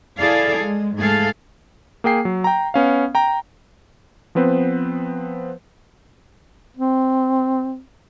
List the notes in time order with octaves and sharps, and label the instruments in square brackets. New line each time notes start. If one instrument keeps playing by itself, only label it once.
[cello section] E4 G#4 A4 D5 F5
G#3
G#2 A3 G#4 A4 F5
[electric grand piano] A#3 G#4 G5 C7
F#3
G5 A#5
B3 C#4 F5
G5 A#5
F3 B3 C4 B4 C5
[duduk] C4